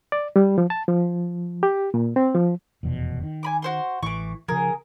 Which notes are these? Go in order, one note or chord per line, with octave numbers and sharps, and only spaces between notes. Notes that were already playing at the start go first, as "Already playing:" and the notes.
D5
G3
F3
A5
F3
G4
A#2
C4
F3
F1 E2 B2
D#3
G#5 B5 D6
F#4 C5 C6
A1 E3 C#6 D6
C#3 F3 G#4 A#4